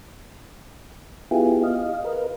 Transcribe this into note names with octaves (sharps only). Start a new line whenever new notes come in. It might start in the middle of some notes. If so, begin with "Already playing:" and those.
B3 E4 F4 G4 G#4
D#5 F5
A#4 B4